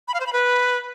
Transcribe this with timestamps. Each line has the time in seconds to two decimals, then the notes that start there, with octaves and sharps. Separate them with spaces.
0.08 B5
0.14 F5
0.20 C5
0.27 B5
0.33 B4